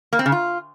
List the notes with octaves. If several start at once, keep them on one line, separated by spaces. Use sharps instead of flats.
A#3
C4
C#3
F4